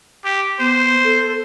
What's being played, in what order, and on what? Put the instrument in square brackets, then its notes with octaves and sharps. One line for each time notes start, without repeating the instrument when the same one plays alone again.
[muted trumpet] G4
[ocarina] B3 [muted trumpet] C5
[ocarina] A4